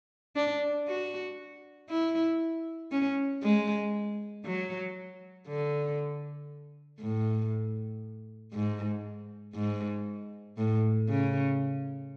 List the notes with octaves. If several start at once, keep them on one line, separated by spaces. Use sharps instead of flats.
D4
F#4
E4
C#4
G#3
F#3
D3
A2
G#2
G#2
A2
C#3